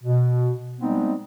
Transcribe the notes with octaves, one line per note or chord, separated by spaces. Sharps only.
B2
G3 G#3 B3 C4 D#4